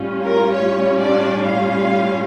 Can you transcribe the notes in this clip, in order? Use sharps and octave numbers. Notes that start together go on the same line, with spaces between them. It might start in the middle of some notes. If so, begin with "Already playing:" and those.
Already playing: A2 G3 C#4 F4
A#4
C#5
D4 D5
F4 F5